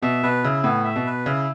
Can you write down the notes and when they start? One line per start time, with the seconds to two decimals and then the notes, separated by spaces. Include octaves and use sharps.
0.02 B2 E5
0.23 B2 B4
0.44 C#3 E4
0.64 A2 B3
0.84 E5
0.96 B2
1.06 B4
1.26 C#3 E4